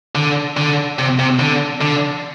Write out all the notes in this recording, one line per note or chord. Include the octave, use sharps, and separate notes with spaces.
D3
D3
C3
C3
D3
D3